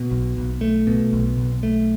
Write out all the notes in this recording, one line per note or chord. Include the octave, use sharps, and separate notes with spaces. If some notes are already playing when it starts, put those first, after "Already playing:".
Already playing: B2
B1
B1
A3
B2
B1
B1
A3